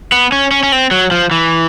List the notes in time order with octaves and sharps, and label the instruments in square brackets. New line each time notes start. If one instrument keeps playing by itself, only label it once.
[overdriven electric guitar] B3
C#4
C#4
C#4
C4
F#3
F3
E3